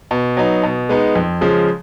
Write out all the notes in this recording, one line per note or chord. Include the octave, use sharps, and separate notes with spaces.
B2
F#3 B3 D#4
B2
G#3 B3 D#4
F2
C#3 F3 G#3